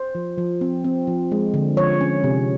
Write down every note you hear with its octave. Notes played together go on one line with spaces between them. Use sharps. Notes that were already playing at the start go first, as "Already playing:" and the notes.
Already playing: C5
F3
F3
C4
C4
F3
G#3
D3
F3 C#5
C#4
C3